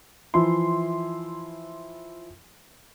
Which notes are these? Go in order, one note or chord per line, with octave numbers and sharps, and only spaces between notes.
E3 F3 E4 C6